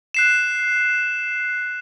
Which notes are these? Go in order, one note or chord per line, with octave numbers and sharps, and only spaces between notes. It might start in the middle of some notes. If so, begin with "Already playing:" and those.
F#6 C7 E7